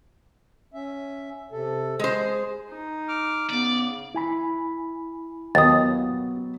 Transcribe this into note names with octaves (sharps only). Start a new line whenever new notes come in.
C#4 E5
C3 A4
G#3 G#4 C5
D#4
D6 F6
C#3 B3 D5
E4 G#5 B5
D#2 F#3 B3 D#6 A6